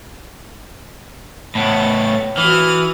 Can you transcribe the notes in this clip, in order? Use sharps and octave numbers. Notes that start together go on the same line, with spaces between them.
A2 B3 C#5 A6
E3 F#4 D#6 F6